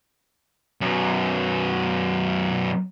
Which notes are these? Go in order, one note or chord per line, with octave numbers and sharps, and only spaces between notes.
F#2 B2